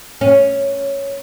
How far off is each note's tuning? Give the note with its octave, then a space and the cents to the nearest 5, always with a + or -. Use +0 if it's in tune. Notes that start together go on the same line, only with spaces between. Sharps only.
C#4 +0